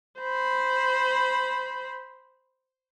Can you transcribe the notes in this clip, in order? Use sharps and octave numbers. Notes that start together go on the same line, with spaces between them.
C5 B5